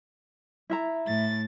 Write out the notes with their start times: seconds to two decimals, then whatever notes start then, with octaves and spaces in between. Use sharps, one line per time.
0.70 E4 E5 A#5
1.06 A2 A6